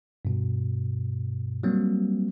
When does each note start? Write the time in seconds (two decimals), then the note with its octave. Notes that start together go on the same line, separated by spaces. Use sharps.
0.25 G2 B2
1.63 F#3 G3 A#3 C4